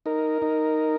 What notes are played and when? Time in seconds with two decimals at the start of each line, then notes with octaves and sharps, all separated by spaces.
0.06 D#4 A#4
0.42 D#4